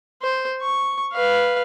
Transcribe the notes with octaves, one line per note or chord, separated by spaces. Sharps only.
C5
C#6
B4 F5